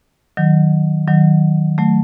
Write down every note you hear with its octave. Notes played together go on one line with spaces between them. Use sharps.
D#3 F#3
D#3 F#3
F#3 A3